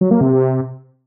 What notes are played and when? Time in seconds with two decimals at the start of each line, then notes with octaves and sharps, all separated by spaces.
0.01 F#3
0.11 A#3
0.21 C3